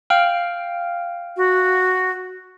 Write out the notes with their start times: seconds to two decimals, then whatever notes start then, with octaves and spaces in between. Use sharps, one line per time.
0.10 F5 G5 F6
1.37 F#4